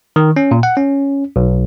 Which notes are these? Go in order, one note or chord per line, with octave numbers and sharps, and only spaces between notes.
D#3
C#4
A#2
F#5
C#4
B1